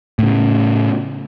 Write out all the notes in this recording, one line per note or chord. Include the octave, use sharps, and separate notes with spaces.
A2 C#3